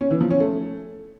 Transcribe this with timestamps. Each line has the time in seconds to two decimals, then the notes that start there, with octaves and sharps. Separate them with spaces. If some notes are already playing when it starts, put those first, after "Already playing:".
0.01 C#4
0.11 E3
0.21 F3
0.31 C#4
0.40 A3